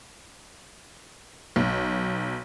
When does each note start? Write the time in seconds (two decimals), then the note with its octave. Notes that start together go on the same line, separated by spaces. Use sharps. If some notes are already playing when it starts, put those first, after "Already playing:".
1.56 B1